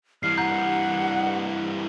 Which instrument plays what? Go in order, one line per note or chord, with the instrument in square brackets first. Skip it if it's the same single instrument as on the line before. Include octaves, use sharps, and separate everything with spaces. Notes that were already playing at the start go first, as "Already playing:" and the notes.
[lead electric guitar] G2 E3 [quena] F6 [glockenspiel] C7
[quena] F#5 [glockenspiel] A#5 G6